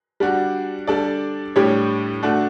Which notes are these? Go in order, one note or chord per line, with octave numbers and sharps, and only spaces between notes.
G3 D4 F#4
G3 D4 A4 D5
A2 G3 D4 G4 C#5
A3 D4 F#4